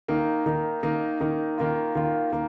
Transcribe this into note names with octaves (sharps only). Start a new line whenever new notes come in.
D#3 A#3 D#4
D#3 A#3 D#4
D#3 A#3 D#4
D#3 A#3 D#4
D#3 A#3 F4
D#3 A#3 F4
D#3 A#3